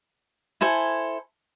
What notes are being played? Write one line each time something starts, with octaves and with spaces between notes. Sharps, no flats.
E4 A4 C5 G#5